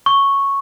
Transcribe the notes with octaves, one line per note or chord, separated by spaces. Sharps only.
C#6